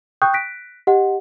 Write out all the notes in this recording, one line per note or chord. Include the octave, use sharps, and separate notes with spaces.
G5 C#6 D#6 F#6 G6
F#6 A#6 B6 D7
G4 D#5 F#5